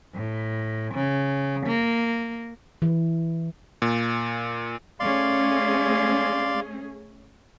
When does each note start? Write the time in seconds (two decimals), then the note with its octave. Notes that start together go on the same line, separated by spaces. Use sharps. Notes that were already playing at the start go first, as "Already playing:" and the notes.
0.14 A2
0.94 C#3
1.66 A#3
2.82 E3
3.82 A#2
5.00 A3 C#4 G#4 D5 F5 C6